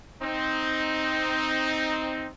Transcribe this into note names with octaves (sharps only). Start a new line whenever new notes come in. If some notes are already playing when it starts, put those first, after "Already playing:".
C4 D#4